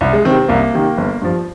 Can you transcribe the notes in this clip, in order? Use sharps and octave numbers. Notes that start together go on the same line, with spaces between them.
C2
G#3
C3 D#3 C4
C4
C2 A#3
C3 D#3
G1
G2 F3